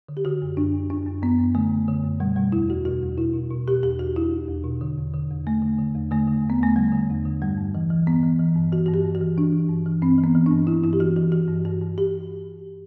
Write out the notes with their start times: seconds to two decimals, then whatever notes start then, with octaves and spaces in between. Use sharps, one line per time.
0.09 D3
0.17 G4
0.25 D3 F#4
0.42 F#2
0.57 F#2 D4
0.73 F#2
0.90 F#2 D4
1.06 F#2
1.23 F#2 B3
1.39 F#2
1.55 D3 A3
1.71 F#2
1.88 D3
2.04 F#2
2.20 B2 G3
2.36 B2 G3
2.52 E2 E4
2.69 E2 F#4
2.85 B2 F#4
3.02 E2
3.18 B2 E4
3.34 B2
3.51 B2
3.67 B2 G4
3.83 E2 G4
3.99 E2 F#4
4.16 E2 E4
4.32 E2
4.48 E2
4.64 B2
4.81 D3
4.98 E2
5.14 D3
5.30 E2
5.46 E2 A3
5.62 D3
5.78 D3
5.95 E2
6.11 D3 A3
6.27 D3
6.44 E2
6.50 B3
6.60 E2 A3
6.76 D3 G3
6.92 D3
7.10 E2
7.25 D3
7.42 G2 G3
7.58 G2
7.75 E3
7.90 E3
8.07 G2 B3
8.23 E3
8.39 E3
8.55 G2
8.72 E3 F#4
8.86 G2 F#4
8.94 G4
9.05 G2
9.15 F#4
9.21 E3
9.37 E3 D4
9.53 E3
9.69 G2
9.86 E3
10.02 G2 C4
10.18 E3
10.24 B3
10.35 E3
10.46 G2 D4
10.67 E3 E4
10.84 G2 E4
10.93 G4
11.00 E3 F#4
11.16 E3 F#4
11.32 E3 F#4
11.48 G2
11.65 G2 F#4
11.82 G2
11.98 G4